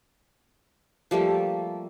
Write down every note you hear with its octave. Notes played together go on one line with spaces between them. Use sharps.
F3 G3 A3 A#3